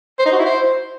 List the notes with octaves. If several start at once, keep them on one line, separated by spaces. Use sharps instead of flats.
C5
D#4
F#4
E4
C5